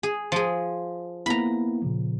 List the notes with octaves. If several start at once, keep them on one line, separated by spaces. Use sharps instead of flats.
G#4
F3 G#4
A#3 B3 E4 A#5 B5
A#2 C#3 F3